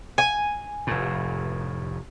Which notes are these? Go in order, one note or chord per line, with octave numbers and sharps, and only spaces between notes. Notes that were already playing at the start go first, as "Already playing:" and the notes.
G#5
F1 A2